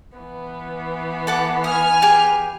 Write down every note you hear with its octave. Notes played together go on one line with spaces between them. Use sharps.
E3 B3
A4 F#5 D6
G#5 D#6 F6
G4 G#4